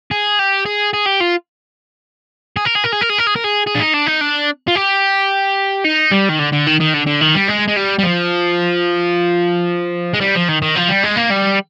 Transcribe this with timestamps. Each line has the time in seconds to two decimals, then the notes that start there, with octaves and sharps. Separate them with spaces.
0.11 G#4
0.39 G4
0.66 G#4
0.94 G#4
1.06 G4
1.21 F4
2.57 G#4
2.65 A#4
2.75 G#4
2.84 A#4
2.92 G#4
3.01 A#4
3.09 G#4
3.18 A#4
3.27 G#4
3.36 A#4
3.44 G#4
3.67 G#4
3.75 D4
3.80 D#4
3.93 D4
4.06 D#4
4.21 D4
4.68 F4
4.75 G4
5.85 D#4
6.12 G3
6.29 D#3
6.39 D3
6.53 D3
6.67 D#3
6.81 D#3
6.94 D3
7.07 D3
7.21 D#3
7.35 G3
7.48 G#3
7.68 G#3
7.76 G3
7.99 G3
8.03 F3
10.14 G#3
10.21 G3
10.35 F3
10.49 D#3
10.62 D#3
10.76 F3
10.89 G3
11.04 G#3
11.17 A#3
11.31 G3